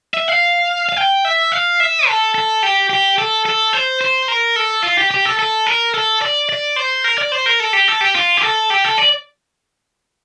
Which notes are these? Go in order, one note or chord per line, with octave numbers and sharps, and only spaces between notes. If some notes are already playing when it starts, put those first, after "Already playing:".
E5
F5
F5
G5
E5
F5
E5
A4
A4
G4
G4
A4
A4
C5
C5
A#4
A4
F4
G4
G4
A4
A4
A#4
A4
D5
D5
C5
A#4
D5
C5
A#4
A4
G4
A4
G4
F4
G4
A4
G4
A4
D5